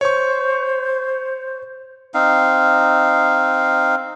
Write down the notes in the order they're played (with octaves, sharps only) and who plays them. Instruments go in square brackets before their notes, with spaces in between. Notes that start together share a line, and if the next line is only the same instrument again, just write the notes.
[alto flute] C5 [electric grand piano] C#5 C#6
[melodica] C4 D#4 F5